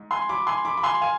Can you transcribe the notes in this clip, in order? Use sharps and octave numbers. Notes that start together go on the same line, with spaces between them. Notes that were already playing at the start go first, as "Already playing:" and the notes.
Already playing: G#2
G#5 C6
B5 D6
G#5 C6
B5 D6
B5
G#5 C6
F5 G#5